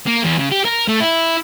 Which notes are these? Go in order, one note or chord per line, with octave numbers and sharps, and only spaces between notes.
A#3
E2
C#3
G4
A#4
A3
E4